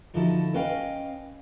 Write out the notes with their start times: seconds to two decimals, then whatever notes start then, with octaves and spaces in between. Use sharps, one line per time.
0.14 D3 F3 D#4 E4 F#4 A4
0.54 C#4 B4 D#5 F5 G5